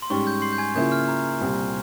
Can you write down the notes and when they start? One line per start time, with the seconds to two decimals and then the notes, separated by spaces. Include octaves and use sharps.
0.02 C6
0.10 G#2 G3 C#4 C#6
0.27 G6
0.42 C6 C7
0.53 G6
0.58 G#5 G#6
0.75 C#3 F3 A#3 C#4 E4 G6
0.92 F6
1.08 A#5
1.41 C2 A#2 G3 C4